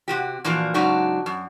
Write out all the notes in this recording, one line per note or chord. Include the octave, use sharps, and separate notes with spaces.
C3 F#4 G4
A#2 E3 F3 A#3 D4 F#4
G#2 C#3 F#3 D4 D#4 F#4
F#2